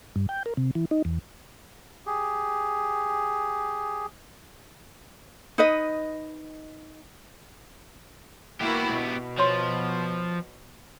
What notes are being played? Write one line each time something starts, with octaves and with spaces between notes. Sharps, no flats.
G2
G5
A#4
C3
E3
D#4
E2
G4 G#4
D#4 B4 D#5
A#3 B3 E4 F#4 G4
B2
F3 C#5 C6